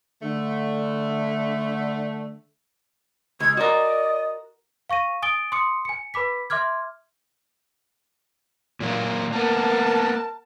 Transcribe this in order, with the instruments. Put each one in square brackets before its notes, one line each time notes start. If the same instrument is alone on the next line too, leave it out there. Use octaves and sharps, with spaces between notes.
[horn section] D3 A3
[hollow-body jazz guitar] C#2 [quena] G#6
[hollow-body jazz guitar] F#4 A#4 [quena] D5 [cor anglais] D#5
[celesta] F5 C#6 A#6 D#7
G#5 D#6 A6 D7 G7
C6 D6 D#6 C#7
G#5 C#7
B4 B5 D6 B6
E5 C6 D6 F6 G#6
[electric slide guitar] A#2 F#3 A#3
[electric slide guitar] A#3 B3 [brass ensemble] A#4 F#5 A5